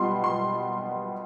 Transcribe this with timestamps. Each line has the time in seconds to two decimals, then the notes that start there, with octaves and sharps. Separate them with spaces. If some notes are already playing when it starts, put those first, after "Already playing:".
Already playing: B2 G3 B3 F4 C6
0.24 C6